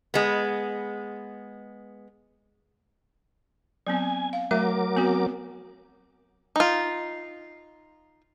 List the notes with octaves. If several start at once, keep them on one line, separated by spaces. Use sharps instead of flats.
G#3 B3
F#3 B3 C4 G#5
F5
F#3 A3 A#4 E5 D6
B3 C4 F#4
D#4 F4